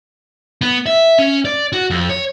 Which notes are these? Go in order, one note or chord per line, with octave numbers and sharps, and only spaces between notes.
B3
E5
C#4
D5
F#4
F2
C#5